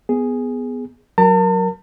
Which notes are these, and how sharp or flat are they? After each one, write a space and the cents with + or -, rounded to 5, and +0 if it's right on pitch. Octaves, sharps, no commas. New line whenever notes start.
B3 +5 G#4 +0
F#3 +0 A#4 +0 A5 +40